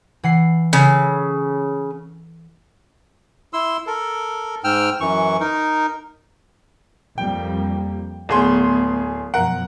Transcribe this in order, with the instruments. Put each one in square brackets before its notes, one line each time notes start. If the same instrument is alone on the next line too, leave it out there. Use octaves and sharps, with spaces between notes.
[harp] E3 F#5 C7
[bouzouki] C#3 [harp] A4
[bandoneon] E4 C6 E6
A4 A#4
G#2 G5 E6 F6
F#2 E3 C#6
D#4 A#4
[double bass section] F2 G3 A#3 [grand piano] G5
[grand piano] D1 G#4 C6 [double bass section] A3 B3
[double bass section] F#2 B2 F3 [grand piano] A#4 F#5